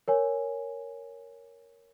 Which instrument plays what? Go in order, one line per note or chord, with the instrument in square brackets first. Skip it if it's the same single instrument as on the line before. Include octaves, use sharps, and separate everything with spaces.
[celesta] A#4 C#5 G#5